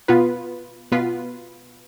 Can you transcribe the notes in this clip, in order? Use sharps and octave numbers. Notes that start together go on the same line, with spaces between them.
B2 B3 F4 B4
B2 B3 F4 B4